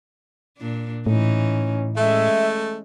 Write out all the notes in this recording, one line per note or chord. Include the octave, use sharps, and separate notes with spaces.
A#2 D4
A2 E3 C#4 D#4
G#3 A3 C#4 E5